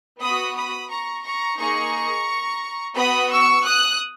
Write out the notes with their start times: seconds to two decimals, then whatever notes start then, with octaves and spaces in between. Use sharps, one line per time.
0.20 B3 F#4 B5 D#6
0.55 B5 D#6
0.88 A#5 C#6
1.23 A#5 C#6
1.57 A#3 D#4 G#4 A#5 C#6
2.95 B3 F#4 B5 D#6
3.30 C#6 E6
3.64 D#6 F#6